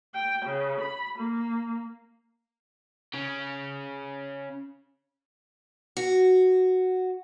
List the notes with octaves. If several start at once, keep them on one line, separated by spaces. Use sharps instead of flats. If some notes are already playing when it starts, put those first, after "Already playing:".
G5
C#3
B5
A#3
C#3 C#4
F#4